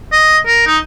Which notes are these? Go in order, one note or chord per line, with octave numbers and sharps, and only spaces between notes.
D#5
A#4
D#4